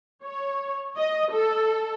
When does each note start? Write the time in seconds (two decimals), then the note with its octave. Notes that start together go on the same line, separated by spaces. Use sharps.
0.24 C#5
0.97 D#5
1.33 A4